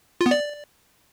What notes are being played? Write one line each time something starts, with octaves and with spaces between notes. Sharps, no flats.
F4
B3
D5